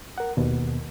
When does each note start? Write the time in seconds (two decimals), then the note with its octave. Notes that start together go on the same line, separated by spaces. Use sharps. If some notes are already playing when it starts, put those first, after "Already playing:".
0.18 A#4 F#5
0.37 D#2 B2